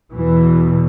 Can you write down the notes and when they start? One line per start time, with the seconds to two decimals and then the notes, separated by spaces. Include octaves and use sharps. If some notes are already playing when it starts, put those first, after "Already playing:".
0.13 E2 B2 E3